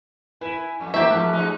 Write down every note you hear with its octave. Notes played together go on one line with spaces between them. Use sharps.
E4 B4 G#5 B6
F2 A3
E3 A#3 C4 G4 E5 A#5
G#2 F3 A3 F#6
F2 G#3 D#4